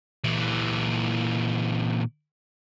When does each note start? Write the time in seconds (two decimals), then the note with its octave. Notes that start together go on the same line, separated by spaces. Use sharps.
0.24 A#2 E3